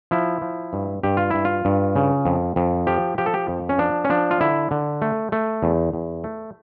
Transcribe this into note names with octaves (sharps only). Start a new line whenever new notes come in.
F3 E4
F3
G2
G2 G4
F4
G2 E4
F4
G2
C#3
F2
F2
F3 G4
F3 G4
A4
G4
F2
C#4
F3 D4
C#4
F3 D4
F4
D3 E4
D3
A3
A3
E2
E2
A3